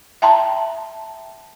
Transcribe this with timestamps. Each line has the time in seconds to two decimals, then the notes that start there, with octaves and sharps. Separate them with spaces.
0.22 E5 G5 A5 A#5 C6